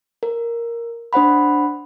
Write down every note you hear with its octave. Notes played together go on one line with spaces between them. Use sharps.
A#4
D4 C5 F#5 B5